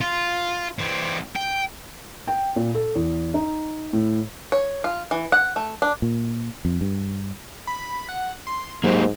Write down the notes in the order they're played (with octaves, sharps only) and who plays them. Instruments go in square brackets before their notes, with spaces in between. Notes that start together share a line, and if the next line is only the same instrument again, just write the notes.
[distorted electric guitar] F4
E3 C4
G5
[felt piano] G5
A#2
A4
E2
D#4
A2
[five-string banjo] C#5
F4
E3
F#5
A3
D4
[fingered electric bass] A#2
F2
G2
[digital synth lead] B5
F#5
C6
[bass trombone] G#2 [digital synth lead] F#3 [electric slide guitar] A#3 G4 C5